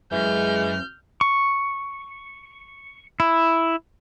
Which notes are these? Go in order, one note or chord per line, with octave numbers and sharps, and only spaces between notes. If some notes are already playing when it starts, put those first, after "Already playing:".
F#2 E3 G#3 F6 G6
C#6
E4